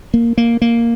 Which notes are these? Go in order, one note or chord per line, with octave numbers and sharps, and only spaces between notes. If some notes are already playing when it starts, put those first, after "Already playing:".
A#3
A#3
A#3